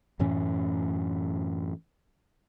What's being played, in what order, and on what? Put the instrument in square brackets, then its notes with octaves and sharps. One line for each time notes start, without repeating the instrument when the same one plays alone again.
[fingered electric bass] F#2 A2 E3 C#4